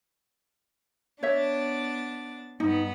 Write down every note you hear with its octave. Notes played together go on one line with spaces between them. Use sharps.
B3 D4 C#5 E5 A6
G2 B3 D#4